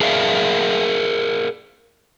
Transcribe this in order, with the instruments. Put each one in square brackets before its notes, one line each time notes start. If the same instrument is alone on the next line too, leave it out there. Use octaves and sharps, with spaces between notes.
[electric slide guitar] G#4 A#4 D5 E5 F5